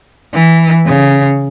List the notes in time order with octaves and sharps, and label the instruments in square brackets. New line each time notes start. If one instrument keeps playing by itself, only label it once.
[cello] E3
C#3